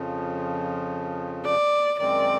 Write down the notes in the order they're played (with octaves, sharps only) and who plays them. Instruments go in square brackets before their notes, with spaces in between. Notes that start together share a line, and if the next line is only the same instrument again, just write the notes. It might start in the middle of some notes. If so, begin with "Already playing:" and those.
Already playing: [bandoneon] F2 C#3 F3
[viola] D5
[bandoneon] F#2 D#3 G#3 C4 [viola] D5